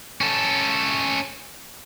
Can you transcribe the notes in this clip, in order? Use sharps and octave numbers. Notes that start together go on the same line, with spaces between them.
C#4 A4